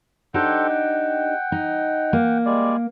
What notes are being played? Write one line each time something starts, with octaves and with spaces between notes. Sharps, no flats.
D4 D#4 G4 A4 C5 F#5
F#5 G5
D#4
A#3
G3 G#3 D5